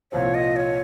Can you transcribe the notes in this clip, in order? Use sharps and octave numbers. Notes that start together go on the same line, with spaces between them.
C2 A#2 F3 C4 C#5
D#5
C#5